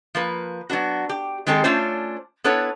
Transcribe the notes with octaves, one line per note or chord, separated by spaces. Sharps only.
F3 A#3 B4
F#3 B3 D4 F#4
G4
D#3 G#3 C4 G4 A4
A3 C#4 D4 F4 C5 C#5
B3 D4 E4 A4 B4 C#5